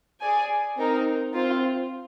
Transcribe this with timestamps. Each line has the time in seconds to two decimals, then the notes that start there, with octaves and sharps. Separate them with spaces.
0.20 G#4 D5 G#5
0.78 C4 D#4 A#4
1.34 C4 F4 C5